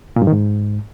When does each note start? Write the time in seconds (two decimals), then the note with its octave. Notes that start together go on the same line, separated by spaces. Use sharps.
0.16 A#2
0.22 G2
0.27 D#3
0.33 G#2